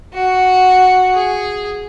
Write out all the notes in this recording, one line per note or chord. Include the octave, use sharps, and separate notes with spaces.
F#4
G#4